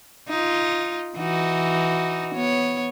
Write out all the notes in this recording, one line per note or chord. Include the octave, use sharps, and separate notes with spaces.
D#4 F4
E3 D#4 F#4
B3 C#5